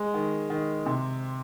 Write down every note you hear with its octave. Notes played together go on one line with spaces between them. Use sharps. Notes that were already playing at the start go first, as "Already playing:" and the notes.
Already playing: G#3
D#3
D#3
C3